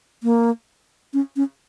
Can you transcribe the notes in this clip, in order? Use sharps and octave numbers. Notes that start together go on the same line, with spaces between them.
A#3
C#4
C#4